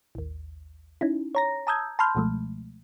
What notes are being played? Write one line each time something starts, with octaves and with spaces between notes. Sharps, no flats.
A1 D#2
C#4 D#4 E4
C#5 A#5 A#6
A5 A#5 D#6 E6 G6 G#6
A5 B5 C6 F6 G6
C#2 B2 F3 G#3 A3